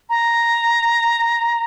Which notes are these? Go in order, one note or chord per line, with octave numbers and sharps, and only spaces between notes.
A#5